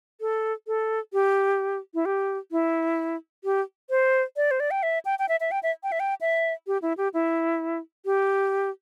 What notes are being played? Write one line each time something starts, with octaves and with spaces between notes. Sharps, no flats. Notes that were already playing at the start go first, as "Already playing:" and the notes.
A4
A4
G4
E4
G4
E4
G4
C5
D5
C5
D5
G5
E5
G5
G5
E5
E5
G5
E5
G5
E5
G5
E5
G4
E4
G4
E4
G4